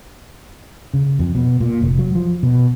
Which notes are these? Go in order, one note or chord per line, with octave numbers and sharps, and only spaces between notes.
C#3
F2
B2
A#2
F1
F#3
F3
B2